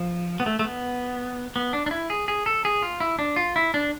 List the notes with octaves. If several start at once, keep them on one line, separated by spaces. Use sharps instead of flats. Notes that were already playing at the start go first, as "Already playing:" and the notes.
Already playing: F3
B3
A3
A3
B3
B3
D4
D4
E4
G#4
G#4
A4
G#4
F4
E4
D4
F4
E4
D4